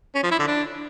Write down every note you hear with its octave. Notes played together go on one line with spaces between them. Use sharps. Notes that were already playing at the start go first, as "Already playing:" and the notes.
C#4
F3
E4
D3
D4